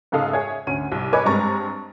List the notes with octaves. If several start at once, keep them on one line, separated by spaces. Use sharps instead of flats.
G#2 C#3 G#3 A4 F5 D#6
G#4 C#5 E5
D2 C#4 D#7
C2
B4 C#5 D#5 G#5 D6
G2 G#3 C4 A#5 C#6 A6